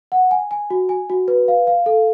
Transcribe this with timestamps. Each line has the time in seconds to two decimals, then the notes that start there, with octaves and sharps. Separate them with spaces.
0.12 F#5
0.31 G#5
0.51 G#5
0.70 F#4
0.89 G#5
1.10 F#4
1.28 B4
1.48 F5
1.67 F5
1.86 A4